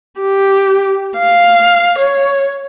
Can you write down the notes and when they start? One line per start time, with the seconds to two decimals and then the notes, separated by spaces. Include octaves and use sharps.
0.20 G4
1.18 F5
1.99 C#5